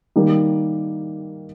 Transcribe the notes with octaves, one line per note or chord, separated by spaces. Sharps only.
D#3 G3 A#3